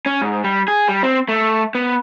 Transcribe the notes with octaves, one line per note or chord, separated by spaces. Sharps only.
C#4
G#2
G3
G#4
G3
C4
A3
B3